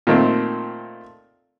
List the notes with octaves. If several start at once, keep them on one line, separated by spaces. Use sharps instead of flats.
A#2 D#3 A3 C4